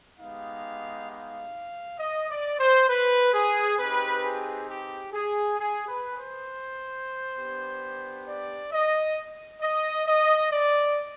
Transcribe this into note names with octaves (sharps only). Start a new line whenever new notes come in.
G#3 B3 D#4 G4 F5
F5
D#5
D5
C5
B4
G#4
C4 D#4 G4 B4
G#4
G4
G#4
G#4
B4
C5
B3 D4 G4
D5
D#5
D#5
D#5
D5